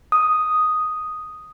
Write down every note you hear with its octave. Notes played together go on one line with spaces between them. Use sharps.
D#6